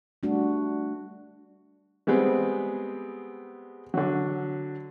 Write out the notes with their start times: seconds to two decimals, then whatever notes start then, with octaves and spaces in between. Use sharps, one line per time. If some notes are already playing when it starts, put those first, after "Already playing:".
0.23 G3 A3 D4 F#4
2.07 G3 G#3 B3 C4 G#4
3.94 D3 F#3